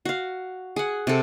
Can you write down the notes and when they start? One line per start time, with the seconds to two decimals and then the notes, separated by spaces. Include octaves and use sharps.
0.05 F#4 F5
0.76 G#4 F#5
1.07 C3 A4